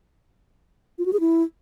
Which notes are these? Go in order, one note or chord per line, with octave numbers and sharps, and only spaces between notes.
F4
F#4
G#4
E4